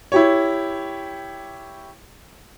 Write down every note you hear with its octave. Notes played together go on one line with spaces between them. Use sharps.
E4 G4 C#5